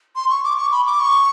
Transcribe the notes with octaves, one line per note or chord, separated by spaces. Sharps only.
C6
C#6
D6
C#6
B5
D6
C#6